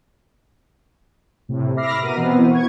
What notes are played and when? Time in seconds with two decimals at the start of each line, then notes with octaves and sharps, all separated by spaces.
1.49 A2 C3
1.76 E5 B5 D6 F6 A#6 C7
2.01 B2 B3 A#4 D#7
2.16 B2 E3 B3 C4
2.38 E4 F#4 C5
2.51 C#6 G#6